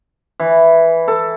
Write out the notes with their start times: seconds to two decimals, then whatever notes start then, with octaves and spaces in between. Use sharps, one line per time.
0.40 E3
1.08 A4